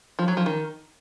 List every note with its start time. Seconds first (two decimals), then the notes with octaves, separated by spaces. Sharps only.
0.19 F3
0.28 F#3
0.37 F3
0.46 D#3